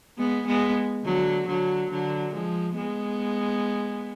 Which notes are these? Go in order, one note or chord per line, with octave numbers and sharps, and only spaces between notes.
G#3 B3
G#3 B3
D3 F#3
D3 F#3
D3 F#3
F3 G#3
G#3 B3